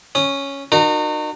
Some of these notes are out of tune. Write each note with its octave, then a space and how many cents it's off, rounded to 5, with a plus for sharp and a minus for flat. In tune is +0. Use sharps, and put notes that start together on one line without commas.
C#4 +0 D#6 -20
D#4 -40 F#4 -15 A#4 +0